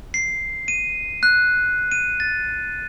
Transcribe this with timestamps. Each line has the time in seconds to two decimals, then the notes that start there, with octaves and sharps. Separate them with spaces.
0.14 C7
0.68 D#7
1.23 F#6
1.91 D#7
2.20 A6